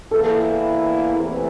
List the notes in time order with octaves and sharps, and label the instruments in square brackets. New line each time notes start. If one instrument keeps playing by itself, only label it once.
[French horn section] E2 E3 A#3 E4 [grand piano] A4
[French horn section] E2 C3 E3 A3